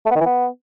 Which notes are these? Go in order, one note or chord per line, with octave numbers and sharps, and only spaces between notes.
A3
B3
D#3
E3
B3